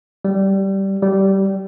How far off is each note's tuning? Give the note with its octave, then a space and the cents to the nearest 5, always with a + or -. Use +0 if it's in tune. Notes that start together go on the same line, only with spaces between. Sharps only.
G3 -10
G3 -15